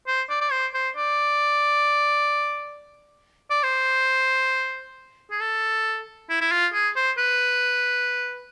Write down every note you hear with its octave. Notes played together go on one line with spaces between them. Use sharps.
C5
D5
D5
C5
C5
D5
D5
C5
G#4
A4
E4
E4
F4
G#4
C5
B4